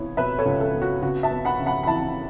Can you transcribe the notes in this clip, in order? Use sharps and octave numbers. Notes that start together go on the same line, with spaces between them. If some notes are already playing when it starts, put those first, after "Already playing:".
Already playing: C#2 B3 E4 C#5
B2 B4 E5
A4 C#5
C#2
A4
B3
F#4
C#3 F#4
E5 A5
B3
F#5 B5
C#3
F#5 B5
B5
E3 E5 A5